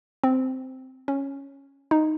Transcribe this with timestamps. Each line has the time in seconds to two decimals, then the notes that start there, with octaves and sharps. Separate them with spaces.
0.24 C4
1.08 C#4
1.91 D#4